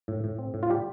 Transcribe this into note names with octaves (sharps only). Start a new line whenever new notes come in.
A2
A2
C4
A2
F4
G3 G4